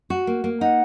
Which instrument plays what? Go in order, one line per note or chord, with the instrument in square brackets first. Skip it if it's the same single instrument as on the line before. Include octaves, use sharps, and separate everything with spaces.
[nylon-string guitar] F#4
A#3
A#3
[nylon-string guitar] D#4 [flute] F#5